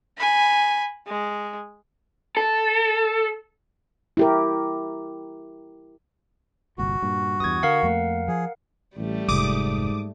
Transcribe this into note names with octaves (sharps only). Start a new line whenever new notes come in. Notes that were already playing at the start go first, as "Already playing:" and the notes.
G#5 B5
G#3
A4
E4 G4 A#4
G1 C2 A#2 F#4
G2 A#2
E2 G2 D#6 G#6
D3 A#4 F5 F#5
F2 A3 A#3
F3 G#4
A1 G3 A3
F1 G#2 D6 D#6